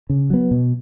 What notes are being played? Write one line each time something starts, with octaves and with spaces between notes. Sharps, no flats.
C#3
F#3 B3
B2